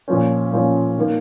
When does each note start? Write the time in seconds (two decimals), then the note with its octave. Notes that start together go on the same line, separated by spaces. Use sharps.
0.08 A#2 F3 C#4
0.52 A#2 F3 C#4
0.98 D#3 A#3